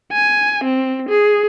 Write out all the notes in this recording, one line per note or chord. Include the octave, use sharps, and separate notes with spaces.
G#5
C4
G#4